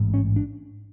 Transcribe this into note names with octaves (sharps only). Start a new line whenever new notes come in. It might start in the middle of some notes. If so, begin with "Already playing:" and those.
Already playing: A1 G#2
C#4
D4